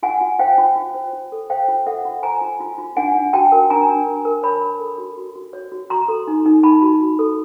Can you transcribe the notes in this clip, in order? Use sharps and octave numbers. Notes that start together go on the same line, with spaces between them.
F4 F#5 G#5
F4
C5 F5 G5
F4
F4
C5
F4
A4
C5 F5 G5
F4
A4 E5 F#5
F4
C5 G#5 A#5
F4
F4
F4
D4 F#5 G#5
D4
F#4 G5 A5
A#4
D4 G#5 A#5
D4
A#4
A#4
C#5 A5 B5
C#5
A4
F#4
F#4
F#4
C#5
F#4
F#4 A#5 C6
A4
D#4
D#4
D#4 A5 B5
F#4
F#4
A4